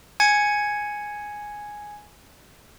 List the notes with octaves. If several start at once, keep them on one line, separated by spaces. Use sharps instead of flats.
G#5 G#6 C#7